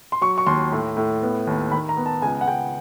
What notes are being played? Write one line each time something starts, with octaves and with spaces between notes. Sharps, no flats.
C6
F#3 C#6
C#6
D#2 C6
A2
A2
B3
D#2
D#3 B5
A#5
B3
A5
C#2 G#5
F#5
C#2 G5